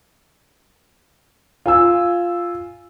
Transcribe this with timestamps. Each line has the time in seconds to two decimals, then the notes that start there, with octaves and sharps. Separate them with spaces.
1.66 F4 G#5 E6